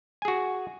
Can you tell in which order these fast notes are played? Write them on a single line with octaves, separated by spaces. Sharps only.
G#5 G#4 F#4